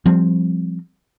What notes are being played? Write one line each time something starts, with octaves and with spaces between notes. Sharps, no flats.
F3 G3 C4